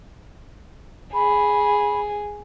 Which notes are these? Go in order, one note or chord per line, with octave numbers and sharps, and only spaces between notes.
G#4 B5